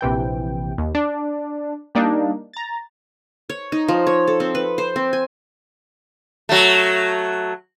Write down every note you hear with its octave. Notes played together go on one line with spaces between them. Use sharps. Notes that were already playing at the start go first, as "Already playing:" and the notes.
A#1 C3 E3 G5
D#2
D4
G3 A#3 D4 D#4
A#5 A6
C#5
D#4
F3
C#5
A4
C4
B4
C5
C4
G#5
F#3 A3